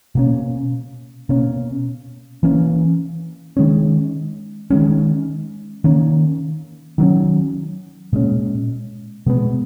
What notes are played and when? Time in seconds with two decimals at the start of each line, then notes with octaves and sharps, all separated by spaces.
0.15 B2 A#3 C#4
1.29 B2 A#3 C#4
2.43 E3 A#3 C#4
3.57 D#3 G#3 C#4
4.70 D#3 G#3 C#4
5.84 D#3 A#3 C#4
6.98 D#3 F#3 A#3 C#4
8.13 A#2 G#3 C#4
9.26 B2 G#3 B3